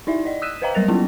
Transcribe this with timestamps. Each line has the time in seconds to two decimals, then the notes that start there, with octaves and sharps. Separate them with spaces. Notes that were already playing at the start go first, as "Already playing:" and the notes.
0.07 D#4 E4 D5 E5
0.25 D5 D#5
0.42 D#6 E6 F#6 B6 D#7 E7
0.62 B4 C5 D#5 F5 G5 A#5
0.74 F#3 G3 A#4 A6 A#6 F7
0.88 F#3 A#3 B3 C#4 E4 F4